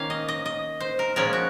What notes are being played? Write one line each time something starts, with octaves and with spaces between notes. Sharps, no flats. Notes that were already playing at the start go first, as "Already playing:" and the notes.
Already playing: D#3 A#3 C#4 F5 G#5
D#5
D#5
D#5
C5
A#4
A#2 F3 G#3 C#4 A#4
F#4